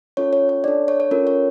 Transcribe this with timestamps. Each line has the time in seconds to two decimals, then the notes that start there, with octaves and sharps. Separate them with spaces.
0.17 C#4 F4 A4 C#5
0.33 C#5
0.49 C#5
0.64 D4 A4 D5
0.88 C#5
1.00 C#5
1.11 C#4 F4 A4 A#4
1.27 C#5